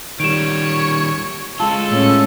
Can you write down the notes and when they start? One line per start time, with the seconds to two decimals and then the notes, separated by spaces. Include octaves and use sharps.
0.20 D#3 G3 C#5 D7 E7
1.60 G#3 F4 A4 A5
1.89 A2 C#4